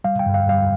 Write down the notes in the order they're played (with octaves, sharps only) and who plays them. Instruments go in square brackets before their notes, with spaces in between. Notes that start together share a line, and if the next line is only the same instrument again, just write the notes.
[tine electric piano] G3 F5
G5
G2
F5
G3 F5